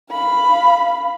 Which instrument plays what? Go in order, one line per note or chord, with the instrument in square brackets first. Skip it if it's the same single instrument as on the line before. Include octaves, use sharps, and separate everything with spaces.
[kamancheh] F5 B5